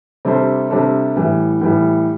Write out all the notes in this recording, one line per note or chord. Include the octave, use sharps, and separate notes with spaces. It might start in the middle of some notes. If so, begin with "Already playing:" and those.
C3 G3 D4 A4 C5
C3 G3 D4 A4 C5
A2 E3 G3
A2 E3 G3